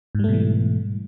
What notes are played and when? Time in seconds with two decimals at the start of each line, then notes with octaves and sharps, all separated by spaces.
0.15 G#2
0.19 G3
0.24 A3
0.29 B2
0.33 E3